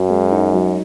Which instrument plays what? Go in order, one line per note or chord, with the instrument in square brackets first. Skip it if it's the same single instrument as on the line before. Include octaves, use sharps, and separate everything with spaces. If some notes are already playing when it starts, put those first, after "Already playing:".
Already playing: [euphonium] F#2 [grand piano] F#3 F#4
[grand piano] G#3
D#4
F#3